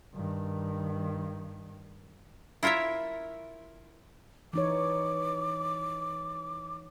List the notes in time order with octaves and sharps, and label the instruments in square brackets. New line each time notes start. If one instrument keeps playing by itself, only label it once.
[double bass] G2 D#3
[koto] E4 F4 A#4 C#5 E5
[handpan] E3 D#4 C#5 [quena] D6